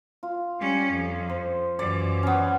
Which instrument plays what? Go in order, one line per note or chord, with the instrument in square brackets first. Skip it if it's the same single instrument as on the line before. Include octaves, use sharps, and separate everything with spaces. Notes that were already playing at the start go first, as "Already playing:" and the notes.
[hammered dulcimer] F4
[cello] G3 C#4
F2
[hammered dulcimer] C5
[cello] F#2 E3 [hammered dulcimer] D5
[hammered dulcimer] B3 C#4